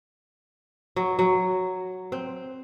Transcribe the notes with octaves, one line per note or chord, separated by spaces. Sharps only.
F#3
F#3
C4